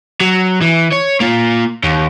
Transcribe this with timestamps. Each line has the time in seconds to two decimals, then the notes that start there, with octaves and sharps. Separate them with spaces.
0.20 F#3
0.61 E3
0.92 C#5
1.20 A#3 F4
1.83 D#2